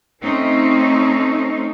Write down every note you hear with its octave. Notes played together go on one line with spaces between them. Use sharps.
A3 C4 C#4 D#4